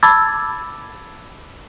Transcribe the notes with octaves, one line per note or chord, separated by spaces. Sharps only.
A5 B5 D6 E6 G#6 A6